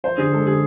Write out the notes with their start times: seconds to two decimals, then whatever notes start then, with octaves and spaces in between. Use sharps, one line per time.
0.04 F3 C5
0.18 D3 G#4
0.32 G#3 A4
0.46 D3 G#4